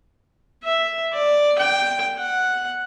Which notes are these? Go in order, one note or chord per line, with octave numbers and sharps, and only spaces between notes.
E5
D5
G5
F#5